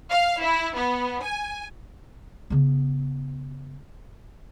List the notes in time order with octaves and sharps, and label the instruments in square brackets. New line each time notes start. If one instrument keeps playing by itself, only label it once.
[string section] F5
E4
B3
G#5
[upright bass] C#3 B3